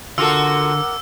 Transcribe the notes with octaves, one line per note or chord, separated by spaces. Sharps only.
D3 F4 F#4 A4 A#4 F#5 D6 E6